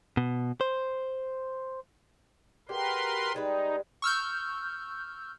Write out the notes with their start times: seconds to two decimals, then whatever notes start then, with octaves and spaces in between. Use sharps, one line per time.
0.17 B2
0.61 C5
2.69 G#3 F#4 G4 A#4 B4 C6
3.34 G3 G#3 D#4 B4
4.02 C#6 E6 F6 G6